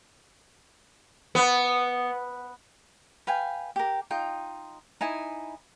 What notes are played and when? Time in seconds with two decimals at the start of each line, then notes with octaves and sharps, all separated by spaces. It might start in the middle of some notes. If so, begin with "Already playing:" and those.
1.35 B3
3.27 B4 F5 G5 G#5
3.76 G4 A#4
4.11 D#4 F4 G5
5.01 D#4 E4 G#5